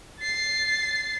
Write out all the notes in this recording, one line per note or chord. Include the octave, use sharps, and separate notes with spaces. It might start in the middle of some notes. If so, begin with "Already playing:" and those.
A6 C7